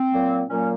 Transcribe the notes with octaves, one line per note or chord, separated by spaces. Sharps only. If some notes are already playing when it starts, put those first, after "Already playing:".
Already playing: C4
A#2 F#3 A#3
A#2 F#3 A#3 C#4